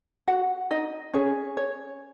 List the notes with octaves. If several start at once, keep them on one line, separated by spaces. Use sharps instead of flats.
F#4 F#5
D#4 D#5
C#4 G#4 C#5
C#5